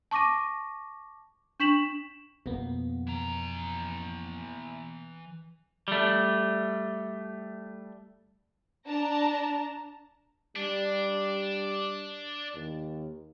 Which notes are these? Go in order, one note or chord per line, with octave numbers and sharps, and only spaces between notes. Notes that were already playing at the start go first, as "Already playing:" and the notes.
A5 C#6 D6 A#6 D#7
D4 C#6 B6 E7 F#7
F2 B2 A#3 B3
E3 A#5
G3 A3
D4 A5 A#5
G3 D4
D#2